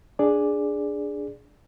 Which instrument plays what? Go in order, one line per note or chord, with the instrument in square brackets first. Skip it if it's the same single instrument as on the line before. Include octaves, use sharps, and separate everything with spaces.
[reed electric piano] D4 G#4 D5